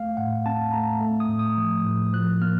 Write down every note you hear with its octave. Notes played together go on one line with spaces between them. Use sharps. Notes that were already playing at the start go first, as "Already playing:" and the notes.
Already playing: A3 F5
A2 F#5
C4 A5
A3 A#5
A3
D#6
A2
D#6
F3
A2
F3 F#6
A#3 F6